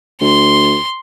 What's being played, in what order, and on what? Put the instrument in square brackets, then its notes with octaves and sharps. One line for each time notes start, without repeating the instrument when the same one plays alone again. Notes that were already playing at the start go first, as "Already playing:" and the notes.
[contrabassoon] D2 [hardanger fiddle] C6